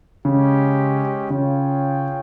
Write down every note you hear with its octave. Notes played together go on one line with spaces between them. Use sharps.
C#3 G#3 C#4 G4
C#3 C#4 F4 G#4 C#5 G5